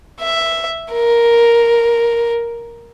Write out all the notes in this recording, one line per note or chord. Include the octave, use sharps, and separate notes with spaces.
E5
A#4